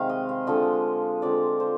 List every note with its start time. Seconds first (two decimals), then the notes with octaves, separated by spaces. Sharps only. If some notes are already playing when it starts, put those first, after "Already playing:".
Already playing: C3 D#3 G#3 F5
0.09 D#5
0.29 F5
0.47 D3 F3 G#3 D#5
1.22 D3 F3 C4 D5
1.60 C5